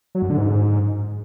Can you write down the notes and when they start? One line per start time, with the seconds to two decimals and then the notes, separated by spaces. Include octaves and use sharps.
0.15 F#3
0.22 F#2
0.30 D3
0.37 G#2